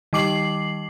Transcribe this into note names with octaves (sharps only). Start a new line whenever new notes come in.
D#3 G3 D6 C7 F#7